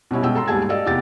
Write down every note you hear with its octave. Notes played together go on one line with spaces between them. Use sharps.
B2 G3 C#4 E4
B2 G#3 G5 E6
A4 A#5 C6
D#2 G#2 G3 G#4 A5 G#6
G4 A4 D5 D#5 F5
F1 E2 G4 F#5 G5 A6